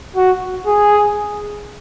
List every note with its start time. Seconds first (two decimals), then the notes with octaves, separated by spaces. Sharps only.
0.16 F#4
0.67 G#4